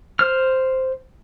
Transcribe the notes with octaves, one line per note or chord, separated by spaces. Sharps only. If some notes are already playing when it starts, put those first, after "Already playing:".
C5 F6